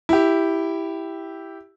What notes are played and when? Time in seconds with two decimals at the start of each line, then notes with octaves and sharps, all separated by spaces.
0.09 E4 G4